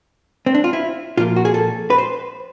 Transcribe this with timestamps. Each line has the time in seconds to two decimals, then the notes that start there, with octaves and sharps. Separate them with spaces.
0.46 C4
0.55 D4
0.64 F4
0.73 E4
1.18 A#2 F3 A#3 F4
1.36 F#4
1.45 G#4
1.54 A4
1.90 B4
1.98 C5